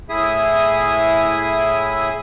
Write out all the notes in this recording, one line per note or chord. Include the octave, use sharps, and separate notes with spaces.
A2 E4 G#4 E5 D#6